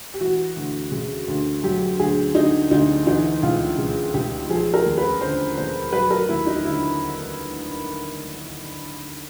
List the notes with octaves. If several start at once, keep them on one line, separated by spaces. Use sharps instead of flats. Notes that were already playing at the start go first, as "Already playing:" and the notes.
G4
E3 F#4
D2
C#3
D2
F#3 G4
D2 G#4
D3 D#4
D2 D#4
E3 D#4
C#2 F4
C#3
C#2 G4
F3 G#4
A#4
D#2
B4
D3 C5
D#2 C5
F#3 B4
A#4
D#2 E4
D#4
D3 E4